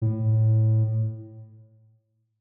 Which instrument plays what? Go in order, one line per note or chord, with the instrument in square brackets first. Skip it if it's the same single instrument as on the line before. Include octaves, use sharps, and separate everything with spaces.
[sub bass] A2